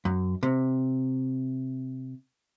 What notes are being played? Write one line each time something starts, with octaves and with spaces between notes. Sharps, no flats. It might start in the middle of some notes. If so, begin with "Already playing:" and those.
F#2
C3